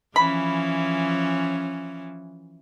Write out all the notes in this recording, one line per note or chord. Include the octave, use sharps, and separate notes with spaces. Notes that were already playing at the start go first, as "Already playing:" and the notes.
E3 F3 C#4 B5